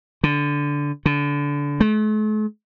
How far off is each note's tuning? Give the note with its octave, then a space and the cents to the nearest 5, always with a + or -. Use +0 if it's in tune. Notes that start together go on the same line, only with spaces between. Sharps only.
D3 -15
D3 -25
A3 -45